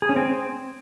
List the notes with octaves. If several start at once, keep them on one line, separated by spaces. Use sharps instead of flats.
G#4
C#4
C4